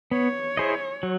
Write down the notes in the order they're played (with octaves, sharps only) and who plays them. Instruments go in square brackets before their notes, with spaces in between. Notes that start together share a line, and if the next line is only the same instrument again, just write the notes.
[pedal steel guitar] B3 [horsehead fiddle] C#5
[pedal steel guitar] E4 G#4 C5 D#5
F#3